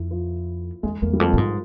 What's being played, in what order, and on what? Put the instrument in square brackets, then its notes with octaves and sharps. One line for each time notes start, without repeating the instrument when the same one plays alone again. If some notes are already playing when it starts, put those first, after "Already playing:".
Already playing: [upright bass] F2 [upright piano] E4
[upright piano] F3
[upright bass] E2 [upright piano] G#3
[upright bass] E2 [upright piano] A#3
[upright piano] G3
[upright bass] F2 [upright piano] G#3
[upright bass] A#2
[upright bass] G#2 [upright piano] F3